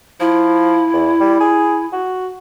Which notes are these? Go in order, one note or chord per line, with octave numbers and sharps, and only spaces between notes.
F3 E4
E2
G3
G#4
F#4